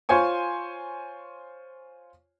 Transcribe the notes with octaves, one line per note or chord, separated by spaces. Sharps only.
F4 C5 C#5 G#5 C#6